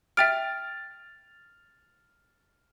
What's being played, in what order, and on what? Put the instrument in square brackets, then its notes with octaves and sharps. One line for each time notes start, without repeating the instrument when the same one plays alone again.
[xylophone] E5 G5 D7 [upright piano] F6 A6